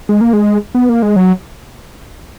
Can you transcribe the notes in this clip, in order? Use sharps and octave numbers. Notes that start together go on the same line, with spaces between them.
G#3
A#3
G#3
B3
A#3
G#3
F#3